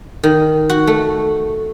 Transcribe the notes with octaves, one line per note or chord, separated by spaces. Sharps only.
D#3
F#4
A3